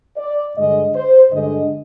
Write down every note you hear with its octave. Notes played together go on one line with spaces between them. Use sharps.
D5
G2 D3 G#3 D#5
C5
G2 D3 G#3 D4 D#5